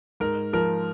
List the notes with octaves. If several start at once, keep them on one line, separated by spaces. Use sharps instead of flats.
G#2 A#4
F3 A#4